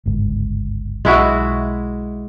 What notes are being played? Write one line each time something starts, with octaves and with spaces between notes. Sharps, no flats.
G1 C#2 G#2
B1 G#3 E4 F#4